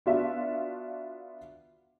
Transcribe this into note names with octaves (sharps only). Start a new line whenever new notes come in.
B3 D4 F4 F#4 E5